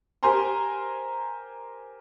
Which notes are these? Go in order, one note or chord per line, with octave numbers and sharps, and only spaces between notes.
G4 A#4 C5 G#5 A#5 C6